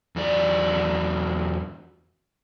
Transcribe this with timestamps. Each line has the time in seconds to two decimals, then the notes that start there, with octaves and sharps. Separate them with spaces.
0.16 E2 F#3 D5